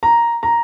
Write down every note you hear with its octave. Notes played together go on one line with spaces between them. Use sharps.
A#5
A#5